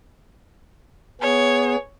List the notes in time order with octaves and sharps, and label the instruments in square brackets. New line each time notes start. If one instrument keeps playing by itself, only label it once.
[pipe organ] B3 G#4 [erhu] C#5